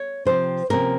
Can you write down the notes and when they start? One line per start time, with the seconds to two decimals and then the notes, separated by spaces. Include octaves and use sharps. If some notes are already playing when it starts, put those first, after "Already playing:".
Already playing: C#5
0.25 C3 F3 C4 C5
0.70 C3 F3 A#3 C#4 A#4